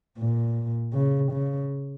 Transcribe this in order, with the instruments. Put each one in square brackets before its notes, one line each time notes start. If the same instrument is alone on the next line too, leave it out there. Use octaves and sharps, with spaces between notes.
[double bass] A#2
C#3
C#3